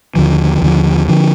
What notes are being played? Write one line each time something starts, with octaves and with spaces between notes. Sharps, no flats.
D#2 D3 F3
D#2 D3 F3
D3 F3